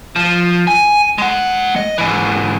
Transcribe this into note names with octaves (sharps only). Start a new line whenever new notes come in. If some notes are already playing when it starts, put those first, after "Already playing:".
F3
G#5
G#3 F#5
D#5
G#2 E3